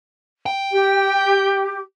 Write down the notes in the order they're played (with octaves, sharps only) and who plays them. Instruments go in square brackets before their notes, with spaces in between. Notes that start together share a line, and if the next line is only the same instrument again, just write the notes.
[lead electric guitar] G5
[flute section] G4